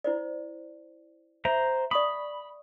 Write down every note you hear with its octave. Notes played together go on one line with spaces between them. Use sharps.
E4 C5 D5
C5 E5 A#5
D5 B5 C#6 D#6